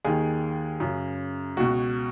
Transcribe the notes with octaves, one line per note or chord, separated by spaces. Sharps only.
D#2 D#3 G#4
F#2 C#3
C#2 B2 F#4